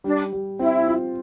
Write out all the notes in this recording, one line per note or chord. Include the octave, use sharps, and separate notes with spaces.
G3 D4
G3
C4 E4
F4